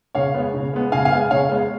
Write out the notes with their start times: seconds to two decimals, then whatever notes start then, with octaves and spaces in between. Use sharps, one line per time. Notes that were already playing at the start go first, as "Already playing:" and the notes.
0.15 C#3 C#5 F5
0.34 G#3 B3
0.54 C#3
0.73 G#3 B3
0.92 C#3 F5 G#5
1.05 F5 G#5
1.11 G#3 B3
1.30 C#3 C#5 F5
1.49 G#3 B3